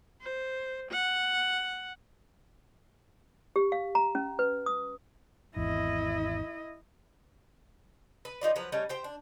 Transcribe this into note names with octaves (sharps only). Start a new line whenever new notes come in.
C5
F#5
G4
F5
A#5
C#4
B4
D#6
G#1 E2 E4 D#5
B4
F3 D#4 F4 D5
F3 F#3 B4 A#5
G3 A3 C#4 D#4
G4 C5 G5
D4